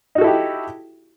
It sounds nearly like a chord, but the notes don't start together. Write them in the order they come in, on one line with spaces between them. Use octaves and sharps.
D#4 F#4 A4 E4 G4